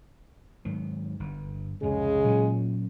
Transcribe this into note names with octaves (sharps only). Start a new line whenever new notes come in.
G#2 D#3 F#3
G1 G2
C2 F2 G#2 C#3 G#3 G#4
A#2 F#3 C#4